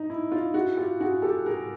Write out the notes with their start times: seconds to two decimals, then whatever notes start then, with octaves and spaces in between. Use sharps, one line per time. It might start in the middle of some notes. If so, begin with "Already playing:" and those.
Already playing: D#4
0.10 E4
0.31 D#4 F4
0.54 E4 F#4
0.77 F4 G4
1.00 F#4 G#4
1.22 G4 A4
1.46 G#4 A#4